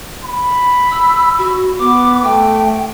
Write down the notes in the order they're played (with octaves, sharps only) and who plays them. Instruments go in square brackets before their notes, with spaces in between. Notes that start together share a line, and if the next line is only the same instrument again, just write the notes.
[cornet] B5
[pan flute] E6
F#4
[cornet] B3 [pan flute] D6
[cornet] A3 [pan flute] G5